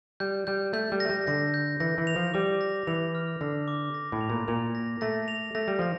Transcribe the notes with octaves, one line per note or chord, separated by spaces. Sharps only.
G3 G6
G3 G6
A3 G6
G3
A3 A#6
G3
D3 A#6
G6
E3 A#6
E3
F7
F3
G3 D6
A#6
E3 F7
F6
D3 A#6
D6
A#6
A2
F7
A#2
A#2 F7
A#6
A3 A#6
F7
A3 A#6
G3
F3 A#6